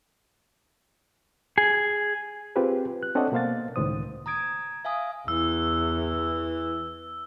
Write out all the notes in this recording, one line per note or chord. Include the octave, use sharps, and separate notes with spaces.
G#4
C4 F4 G4 G#4 B4 C5
F#6
C4 D4 A4 C#5 D#5 F#5
B2 A#3 C5 F5 A6
C#2 A2 D#3 C5 D#6
A#5 D#6 G#6 D7
E5 F5 G#5 D#6
E2 E3 E6